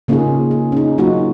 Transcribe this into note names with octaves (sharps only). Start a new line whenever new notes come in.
C#3 A#3 C#4 D#4 F4 G#4
G#4
C#4 D#4
F#3 A#3 D#4 F4 F#4